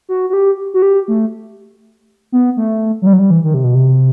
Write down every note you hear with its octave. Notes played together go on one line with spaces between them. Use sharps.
F#4
F#4
G4
F#4
G4
A3
B3
A3
F#3
G3
F#3
G3
E3
D#3
C3
B2
C3